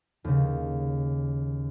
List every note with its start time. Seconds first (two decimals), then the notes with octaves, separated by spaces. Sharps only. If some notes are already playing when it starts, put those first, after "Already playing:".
0.24 D#2 C#3